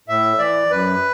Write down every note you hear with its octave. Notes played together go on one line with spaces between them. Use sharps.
A2 E5
E3 D5
F#2 B4